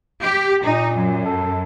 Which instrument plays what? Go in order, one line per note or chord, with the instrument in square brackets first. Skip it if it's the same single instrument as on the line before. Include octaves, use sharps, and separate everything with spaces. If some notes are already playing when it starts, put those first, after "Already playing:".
[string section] G4
[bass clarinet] A#2 [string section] D#4
[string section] F#2
[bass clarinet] A4